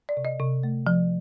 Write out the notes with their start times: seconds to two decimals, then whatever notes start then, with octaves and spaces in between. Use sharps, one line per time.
0.09 D5
0.17 C3
0.25 D#5
0.40 C3
0.63 A3
0.87 F3